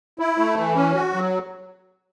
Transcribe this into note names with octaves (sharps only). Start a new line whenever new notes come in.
E4
A3
E3
C#4
F#4
F#3